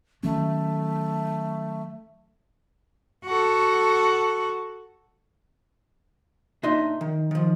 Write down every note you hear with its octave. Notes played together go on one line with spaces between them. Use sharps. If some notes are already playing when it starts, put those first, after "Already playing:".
D#3 F#3 A3 C#4
F#4 A4
A#2 D4 D#4 D#5 E5 C6
D#3
D#3 F3